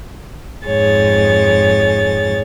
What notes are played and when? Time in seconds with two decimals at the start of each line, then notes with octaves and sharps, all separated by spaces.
0.67 F2 G#2 G#4 C#5 A6